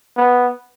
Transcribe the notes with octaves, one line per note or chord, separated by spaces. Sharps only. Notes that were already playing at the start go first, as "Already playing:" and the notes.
B3